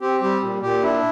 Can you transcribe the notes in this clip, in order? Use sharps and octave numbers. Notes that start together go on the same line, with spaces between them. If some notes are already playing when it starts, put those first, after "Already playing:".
C4 G4
G3 G4
A#2
A#2 G4
D4 E4